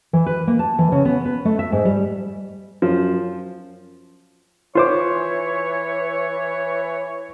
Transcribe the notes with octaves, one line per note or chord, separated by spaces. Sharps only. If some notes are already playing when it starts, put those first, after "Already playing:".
E3
B4
A#3
A5
E3
C#3
B3
B4
A3
E5
G#2
G3
F#2 F3
E3 F4 C5 C#5 D6